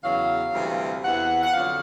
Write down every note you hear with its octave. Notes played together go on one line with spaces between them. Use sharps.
E2 C#3 F#3 F5
D2 C3 E3 G3
E2 C3 E3 F#5
F#5
F2 D3 F#3 F5